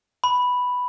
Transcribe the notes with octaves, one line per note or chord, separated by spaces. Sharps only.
B5